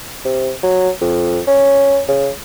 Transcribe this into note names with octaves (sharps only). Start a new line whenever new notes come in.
C3
F#3
F2
C#4
C#3